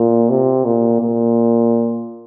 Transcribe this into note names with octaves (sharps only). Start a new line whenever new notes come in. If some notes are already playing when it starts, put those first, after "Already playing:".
Already playing: A#2
C3
A#2
A#2